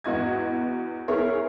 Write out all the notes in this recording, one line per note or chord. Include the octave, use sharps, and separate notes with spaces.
E2 B3 F#4 D#5 G#6
B3 E4 G#4 A#4 C#5